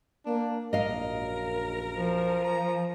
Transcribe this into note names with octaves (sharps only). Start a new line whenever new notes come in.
A#3 D4
A#1 F#2 A#4 D#5 F5
F3
A#5